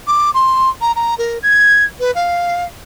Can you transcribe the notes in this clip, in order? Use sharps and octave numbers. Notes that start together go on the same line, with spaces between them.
D6
C6
A#5
A#5
A#4
G#6
B4
F5